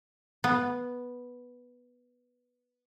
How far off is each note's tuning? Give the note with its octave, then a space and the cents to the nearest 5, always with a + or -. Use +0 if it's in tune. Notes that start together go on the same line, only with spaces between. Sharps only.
B3 -5